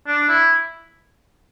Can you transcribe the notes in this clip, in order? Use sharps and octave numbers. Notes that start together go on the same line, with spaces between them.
D4
E4